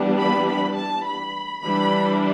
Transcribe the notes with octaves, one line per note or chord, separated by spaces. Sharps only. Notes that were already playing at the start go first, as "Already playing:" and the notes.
Already playing: E3 G3 B3 D4
B5
B5
A5
B5
E3 G3 D4 B5